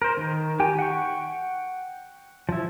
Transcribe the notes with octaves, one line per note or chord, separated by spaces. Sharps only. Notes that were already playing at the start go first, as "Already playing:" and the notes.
A#4 C5
D#3
G4 G5 G#5
F#5 G5 C#6
F3 E4